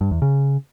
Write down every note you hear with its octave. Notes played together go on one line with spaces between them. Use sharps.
G2
E2
C#3